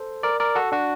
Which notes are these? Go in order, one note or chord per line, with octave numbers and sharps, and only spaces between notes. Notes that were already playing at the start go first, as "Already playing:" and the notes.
Already playing: A4 C5
A#4 D5
A#4 D5
F#4 A4
D4 F#4